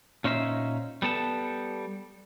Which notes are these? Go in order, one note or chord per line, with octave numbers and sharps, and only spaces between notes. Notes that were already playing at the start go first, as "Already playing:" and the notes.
A#2 C#4 D#4 C5 E5
G3 B3 A4 A5